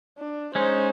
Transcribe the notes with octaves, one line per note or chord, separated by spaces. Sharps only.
D4
G#3 C#4 D#4 C5